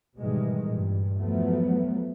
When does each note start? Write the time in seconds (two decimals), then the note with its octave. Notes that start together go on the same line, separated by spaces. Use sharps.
0.18 G#2 B2 D#3 E3 G3 G#3
0.67 G2 A#2
1.19 E2 F3 F#3 A3 B3